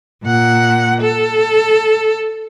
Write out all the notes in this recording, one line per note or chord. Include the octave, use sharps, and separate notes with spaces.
A#2 F#5
A4